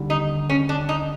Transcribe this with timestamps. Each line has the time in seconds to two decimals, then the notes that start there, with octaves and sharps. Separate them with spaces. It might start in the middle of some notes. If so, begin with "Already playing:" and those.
Already playing: D#2 D3 G3
0.10 D#4
0.50 C#4
0.69 D4
0.89 D#4